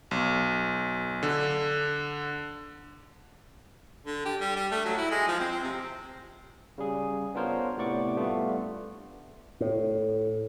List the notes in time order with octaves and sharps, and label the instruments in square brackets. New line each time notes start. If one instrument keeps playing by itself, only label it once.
[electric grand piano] B1
D3
[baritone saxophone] D3
G4
G3
G3
A3
F#3
E4
G#3
F3
C4
C4
C3
[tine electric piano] C#3 G3 G#4
B3 D4 F4 A#4 C5 C#5
A2 C3 B3 D5 C#6 D6
G3 A3 B3 D4 F4
[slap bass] A2